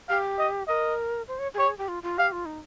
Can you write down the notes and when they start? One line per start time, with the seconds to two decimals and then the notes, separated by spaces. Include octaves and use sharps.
0.09 G4 F5
0.39 D#5
0.68 A#4 D#5
1.28 C5
1.39 C#5
1.54 G#4
1.58 G4 C#5
1.68 G#4
1.78 G4
1.88 F4
2.03 F4
2.18 G4 F5
2.32 F4
2.45 D#4